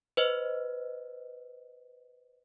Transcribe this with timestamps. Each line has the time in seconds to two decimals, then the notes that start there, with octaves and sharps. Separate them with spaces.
0.17 B4 C5 D#5